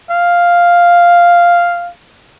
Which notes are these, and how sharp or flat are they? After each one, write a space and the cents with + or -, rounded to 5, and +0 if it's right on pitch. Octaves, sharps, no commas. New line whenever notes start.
F5 +0